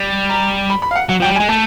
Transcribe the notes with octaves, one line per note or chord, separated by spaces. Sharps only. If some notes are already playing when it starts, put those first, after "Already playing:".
Already playing: G3
A#5
B5
B5
F5
F#5
F#3 F#5
F3 F#3 G5
G3
G#5
G#3
A3 A5